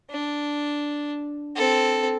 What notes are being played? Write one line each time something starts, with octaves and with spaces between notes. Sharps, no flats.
D4
C4 A4